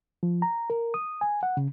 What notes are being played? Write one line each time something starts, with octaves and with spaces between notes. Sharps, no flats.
F3
A#5
A#4
D#6
G#5
F#5
C#3